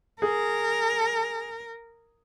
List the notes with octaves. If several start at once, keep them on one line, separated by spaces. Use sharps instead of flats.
G#4 A#4